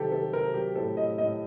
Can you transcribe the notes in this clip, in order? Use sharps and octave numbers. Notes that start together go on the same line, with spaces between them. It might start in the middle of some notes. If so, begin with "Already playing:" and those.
Already playing: C3 D#3 F#3 G4 A4
C3 A4
C3 A#4
F#3 G4
A2 A4
A2 D#5
A2 D#5